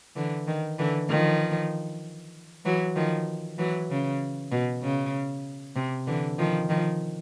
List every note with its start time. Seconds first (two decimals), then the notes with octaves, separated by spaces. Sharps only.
0.16 D3 E3
0.48 D#3
0.79 D3 E3
1.09 D#3 F3
2.65 E3 F#3
2.96 D#3 F3
3.58 E3 F#3
3.90 C#3
4.51 B2
4.83 C#3
5.76 C3
6.07 D3 E3
6.39 D#3 F3
6.69 D#3 F3